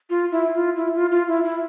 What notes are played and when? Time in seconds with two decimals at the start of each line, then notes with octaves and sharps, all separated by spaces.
0.10 F4
0.32 E4
0.54 F4
0.77 E4
0.95 F4
1.11 F4
1.28 E4
1.44 E4